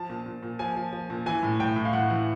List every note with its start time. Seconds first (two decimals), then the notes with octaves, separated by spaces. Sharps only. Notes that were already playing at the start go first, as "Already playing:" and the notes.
Already playing: F3 A5
0.09 A#2
0.26 A#2
0.43 A#2
0.59 F3 G#5
0.76 F3
0.93 F3
1.10 A#2
1.26 E3 G#5
1.43 A2
1.59 A2 G5
1.76 A2
1.85 F5
1.93 A2 F#5
2.10 E3